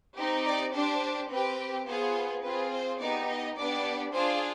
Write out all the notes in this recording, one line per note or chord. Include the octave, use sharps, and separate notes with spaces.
C4 D#4 G4
D5
D4 G4 C5
C4 G4 B4
B3 F4 G#4 C5
C4 F4 G#4 B4
C5
B3 D#4 G4 D5
D#5
B3 D4 G4 D5
D4 F4 G#4 C5